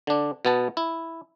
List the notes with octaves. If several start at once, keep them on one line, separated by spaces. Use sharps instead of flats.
D3 D4
B2 B3 A5
E4